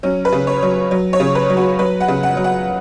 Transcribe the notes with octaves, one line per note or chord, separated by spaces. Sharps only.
F#3 C#4
B4
C#3
C#5
F#3
F#3
C#5
C#3
B4
F#3
F#4
F#3 B4
F#5
C#3
F#5
F#3
F#5